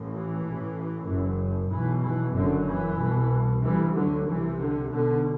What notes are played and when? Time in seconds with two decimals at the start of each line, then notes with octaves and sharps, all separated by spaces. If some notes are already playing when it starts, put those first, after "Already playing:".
Already playing: A1 A2
0.10 E3
0.42 A1 A2
1.06 F#1 F#2
1.70 B1 B2 E3
2.03 E3
2.34 F#1 F#2 D3
2.66 E3
2.99 C2 B2
3.62 D2 C3 E3 G3
3.95 D3 F#3
4.27 C2 C3 E3
4.59 D3
4.91 B1 B2 D3